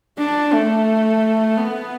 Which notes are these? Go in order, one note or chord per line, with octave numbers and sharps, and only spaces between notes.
D4
A3
B3